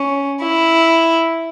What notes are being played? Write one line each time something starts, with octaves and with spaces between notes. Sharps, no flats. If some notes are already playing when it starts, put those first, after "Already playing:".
Already playing: C#4
E4